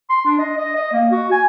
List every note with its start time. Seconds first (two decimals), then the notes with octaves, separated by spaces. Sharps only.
0.10 C6
0.25 D4
0.39 D#5
0.57 D#5
0.76 D#5
0.93 A#3
1.12 F#4
1.31 G#5